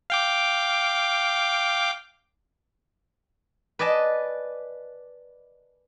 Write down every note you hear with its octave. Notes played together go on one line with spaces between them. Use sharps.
F5 G5 D6
B4 D5 D#5 G#5 A5